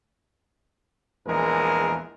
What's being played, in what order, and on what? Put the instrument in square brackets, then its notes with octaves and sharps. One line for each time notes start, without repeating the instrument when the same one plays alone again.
[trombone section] A#1 E2 G#3 A#4